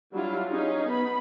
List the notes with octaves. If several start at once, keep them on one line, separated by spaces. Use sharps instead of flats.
F#3 G3 D4 E4 F4
C#4 D#4 G#4
B3 B5